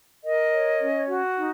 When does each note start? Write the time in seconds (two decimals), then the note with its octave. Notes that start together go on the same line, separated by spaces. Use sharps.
0.23 A#4 D#5
0.51 C#5
0.80 C#4
1.08 F#4
1.36 D#4